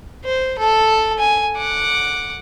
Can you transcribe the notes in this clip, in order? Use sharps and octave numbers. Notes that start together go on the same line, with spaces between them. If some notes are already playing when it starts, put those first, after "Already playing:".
C5
A4 A5
G#5
F#5 D6